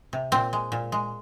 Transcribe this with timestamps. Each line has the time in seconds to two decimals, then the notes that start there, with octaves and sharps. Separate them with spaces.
0.13 C3
0.32 A#2 C4
0.53 G#3
0.72 A#2
0.92 G#3